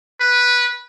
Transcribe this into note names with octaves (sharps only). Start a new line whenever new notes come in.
B4